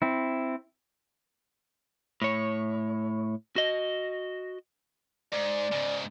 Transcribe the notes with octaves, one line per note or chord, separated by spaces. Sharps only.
C4 E4
A2 C#5
F#4 D#5
G#2 D5
G#2 C#3